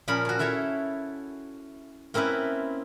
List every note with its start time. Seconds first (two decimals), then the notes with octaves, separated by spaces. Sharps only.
0.08 A#2 F3 C#4 A#4 B5
0.25 C#4 F#4
0.39 E4 A4 C#5 E5 A5
2.14 A#3 C4 C#4 E4 B4